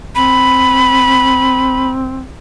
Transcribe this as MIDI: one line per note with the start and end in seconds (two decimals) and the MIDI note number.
0.15 2.30 60
0.15 1.90 83